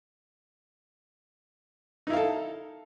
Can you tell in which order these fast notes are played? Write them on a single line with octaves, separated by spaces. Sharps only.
D#4 E4 F5 A4